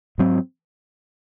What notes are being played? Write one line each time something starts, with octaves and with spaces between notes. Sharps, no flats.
G#2 F#3 C4